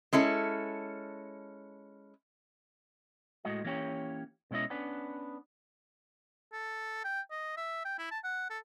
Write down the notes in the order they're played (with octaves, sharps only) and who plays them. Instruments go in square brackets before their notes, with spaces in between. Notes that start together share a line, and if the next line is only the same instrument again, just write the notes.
[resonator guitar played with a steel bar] G#3 C#4 E4 A4
[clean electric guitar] A2 G#3 F#4 D#5
E3 A#3 C#4 G4 C#5
B2 G#3 C#4 E4 D#5
B3 C#4 D4 B4
[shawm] A4
G5
D#5
E5
G5
E4
A5
F#5
A4